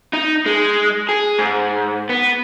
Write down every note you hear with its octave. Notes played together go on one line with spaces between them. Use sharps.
D#4
G#3
G#4
G#2
B3